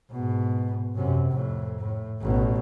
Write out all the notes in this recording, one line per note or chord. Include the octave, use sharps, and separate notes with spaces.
G#2 B2
F#2 C3
F2 A2
A2
A1 B2